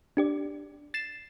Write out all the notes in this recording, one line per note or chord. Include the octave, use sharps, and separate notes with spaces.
D4 G4 D5
A6 C7 E7